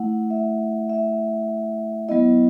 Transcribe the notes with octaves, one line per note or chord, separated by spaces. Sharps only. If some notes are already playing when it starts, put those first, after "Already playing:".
Already playing: A3 E4 F#5
E5
E5
F#3 B3 E4 D#5